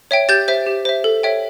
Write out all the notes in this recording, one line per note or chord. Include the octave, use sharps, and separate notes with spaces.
C#5 E5 G5
G4 G6 A6
C5 E5
G4
C5 E5
A4
C#5 E5 G5